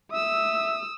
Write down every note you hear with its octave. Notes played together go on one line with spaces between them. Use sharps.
E5 D#6 E6